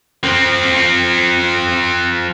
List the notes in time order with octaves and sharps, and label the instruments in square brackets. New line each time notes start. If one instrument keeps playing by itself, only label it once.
[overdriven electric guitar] F3 C4